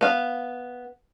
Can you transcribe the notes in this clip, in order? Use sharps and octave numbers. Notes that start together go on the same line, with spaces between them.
B3 F5